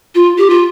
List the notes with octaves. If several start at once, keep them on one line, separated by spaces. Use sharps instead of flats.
F4
G4
F4